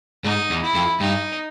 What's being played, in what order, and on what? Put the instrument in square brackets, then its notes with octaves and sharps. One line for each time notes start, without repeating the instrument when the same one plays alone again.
[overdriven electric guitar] G#2 [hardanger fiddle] D#4
[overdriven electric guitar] E2
[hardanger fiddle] E4
[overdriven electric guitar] F2
[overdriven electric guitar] G2 [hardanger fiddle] D#4